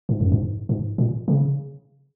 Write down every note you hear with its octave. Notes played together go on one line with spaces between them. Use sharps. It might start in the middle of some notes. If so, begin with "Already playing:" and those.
G#2
F#2
G#2
G#2
A#2
C#3